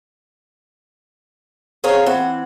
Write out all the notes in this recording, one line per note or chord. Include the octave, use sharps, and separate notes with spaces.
C4 G#4 C5 C#5 F5 A#5
E3 C4 F#5